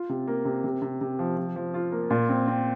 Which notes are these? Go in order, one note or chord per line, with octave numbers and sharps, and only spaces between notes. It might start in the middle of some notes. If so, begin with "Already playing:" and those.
Already playing: F4
C3
A#3
C3
C3
C3
C3
F3
F3
F3
F4
A#3
A#2
C4
C4